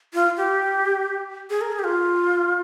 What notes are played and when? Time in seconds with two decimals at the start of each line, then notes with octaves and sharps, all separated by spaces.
0.14 F4
0.37 G4
1.50 G#4
1.61 A#4
1.72 G#4
1.79 G4
1.84 F4